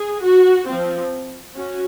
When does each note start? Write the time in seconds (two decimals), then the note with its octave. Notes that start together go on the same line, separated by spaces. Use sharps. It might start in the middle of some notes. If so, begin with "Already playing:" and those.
Already playing: G#4
0.23 F#4
0.68 F3 C4
1.57 C#4 F#4